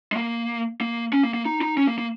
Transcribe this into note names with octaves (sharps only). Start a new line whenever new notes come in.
G#3
A#3
A#3
C#4
A#3
A#3
D#4
D#4
C#4
A#3
A#3